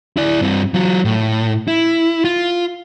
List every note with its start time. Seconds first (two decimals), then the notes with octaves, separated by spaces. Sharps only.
0.17 E4 D5
0.41 G2 C4
0.74 F#3 F4
1.05 A2
1.68 E4
2.25 F4